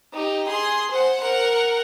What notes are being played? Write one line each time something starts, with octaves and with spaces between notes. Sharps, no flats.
D#4 G4
G#4 C6
C5 F#5
A#4 F#5